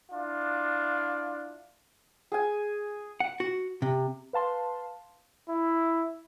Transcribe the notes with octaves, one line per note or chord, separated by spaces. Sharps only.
D4 E4 F4
G#4 G#5
F#5
F#4
C3
B4 F5 A5 C6
E4